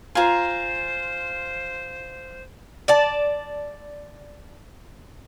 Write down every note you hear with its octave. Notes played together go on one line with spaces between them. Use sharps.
F4 C5 G#5 A#5
D5 A5